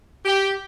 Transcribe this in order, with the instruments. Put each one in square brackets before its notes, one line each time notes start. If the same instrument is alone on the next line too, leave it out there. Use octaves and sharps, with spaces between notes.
[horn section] G4